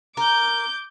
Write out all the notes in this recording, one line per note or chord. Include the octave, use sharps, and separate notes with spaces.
A#4 D6 G6